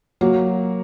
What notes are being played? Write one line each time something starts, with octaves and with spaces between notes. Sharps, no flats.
F#3 A#3